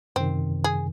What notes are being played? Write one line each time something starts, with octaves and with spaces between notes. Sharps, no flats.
F#2 C3 D#3 C4
G#4